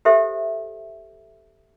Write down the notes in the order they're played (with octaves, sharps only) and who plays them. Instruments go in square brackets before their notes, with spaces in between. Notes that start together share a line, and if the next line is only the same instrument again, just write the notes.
[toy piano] G4 A4 C5 E5